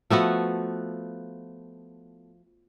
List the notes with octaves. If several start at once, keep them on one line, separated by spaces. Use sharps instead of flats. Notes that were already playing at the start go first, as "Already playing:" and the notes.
F3 A3 B3 F#4